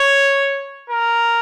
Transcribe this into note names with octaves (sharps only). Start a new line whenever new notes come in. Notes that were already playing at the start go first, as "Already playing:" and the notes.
Already playing: C#5
A#4